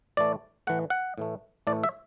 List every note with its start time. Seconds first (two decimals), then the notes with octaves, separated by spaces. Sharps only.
0.17 A2 E3 A3 D5
0.67 A2 E3 A3 F#5
0.90 F#5
1.18 A2 E3 A3
1.67 A2 E3 A3 D5
1.83 E5